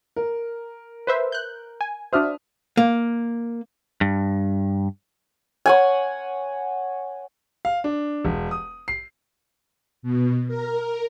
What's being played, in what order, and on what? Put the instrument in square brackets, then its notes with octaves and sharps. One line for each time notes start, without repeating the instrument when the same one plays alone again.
[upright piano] A#4
[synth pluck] B4 C5 E5
F#6 G6
G#5
[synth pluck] D4 F#4 C5 [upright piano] E5 D#6 F6
[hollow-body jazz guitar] A#3
[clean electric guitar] G2
[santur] C#5 F#5 G#5
[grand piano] F5
D4
E1
D#6
C7
[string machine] B2
A#4